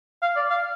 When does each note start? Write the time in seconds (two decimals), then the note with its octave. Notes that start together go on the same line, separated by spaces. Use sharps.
0.22 F5
0.36 D5
0.50 F5